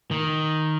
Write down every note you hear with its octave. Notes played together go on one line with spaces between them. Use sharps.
D#3